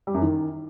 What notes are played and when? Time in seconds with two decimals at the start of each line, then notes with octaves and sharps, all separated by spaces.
0.07 G3
0.14 F#2
0.22 D#3